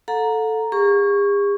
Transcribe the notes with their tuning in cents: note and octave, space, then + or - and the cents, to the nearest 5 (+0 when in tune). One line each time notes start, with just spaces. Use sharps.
A4 +0 F#5 -40 A#5 +0
G#4 -45 C#6 +0